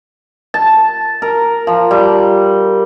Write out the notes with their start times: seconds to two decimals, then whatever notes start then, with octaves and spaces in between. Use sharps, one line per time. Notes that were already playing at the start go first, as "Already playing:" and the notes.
0.54 A5
1.22 A#4
1.67 F3
1.91 G3